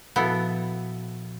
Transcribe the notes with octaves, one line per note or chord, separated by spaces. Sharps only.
A#2 F3 B3 E4 F#4 A4